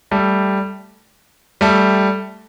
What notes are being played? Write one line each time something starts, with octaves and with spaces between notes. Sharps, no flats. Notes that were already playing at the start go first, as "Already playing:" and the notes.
G3 A3
G3 A3